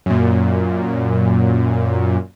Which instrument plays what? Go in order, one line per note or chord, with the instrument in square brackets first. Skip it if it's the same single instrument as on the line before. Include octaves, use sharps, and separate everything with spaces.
[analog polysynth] F#2 A#2